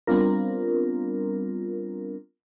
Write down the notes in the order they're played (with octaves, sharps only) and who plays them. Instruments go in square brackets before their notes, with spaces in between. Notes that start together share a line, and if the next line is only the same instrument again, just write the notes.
[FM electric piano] G3 B3 C4 D4 F4 A#4